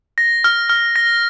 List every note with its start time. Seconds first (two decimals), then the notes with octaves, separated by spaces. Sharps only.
0.18 A#6
0.44 F6
0.69 F6
0.96 A#6